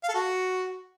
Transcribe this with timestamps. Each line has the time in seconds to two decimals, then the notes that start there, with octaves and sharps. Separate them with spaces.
0.03 F5
0.09 A4
0.14 F#4